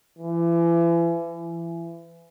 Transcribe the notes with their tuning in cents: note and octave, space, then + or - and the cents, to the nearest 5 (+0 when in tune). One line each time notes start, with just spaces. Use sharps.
E3 +35
E3 +30